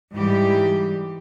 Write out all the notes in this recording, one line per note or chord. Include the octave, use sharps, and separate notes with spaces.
G#2 E3 G3 G4